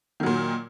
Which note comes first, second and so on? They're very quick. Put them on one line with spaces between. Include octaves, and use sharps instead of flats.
D#3 F#3 A#2